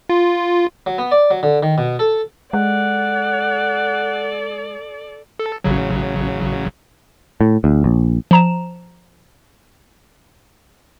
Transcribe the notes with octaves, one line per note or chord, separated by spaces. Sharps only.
F4
F#3
B3
D5
F#3
D3
D#3
B2
A4
G#3 A4 D5 F#5
A4
A1 C#3 F#3
A2
D2
A#1
F3 A#5 E7